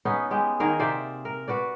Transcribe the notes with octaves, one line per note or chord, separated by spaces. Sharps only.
B3 C#4 D#4 B4
G#3 G4
D#3 A#3 G#4 A#4
C3 C5 D5 E5
A#4
F#4 B4 D5